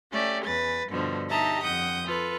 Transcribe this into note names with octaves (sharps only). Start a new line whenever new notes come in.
A3 C#4 G4 D5
E2 B4 A6
G2 B2 D3 F3
D#4 G4 D#5 E5 A5 A#5
F2 F#5 D#6 G6
F4 A4 B4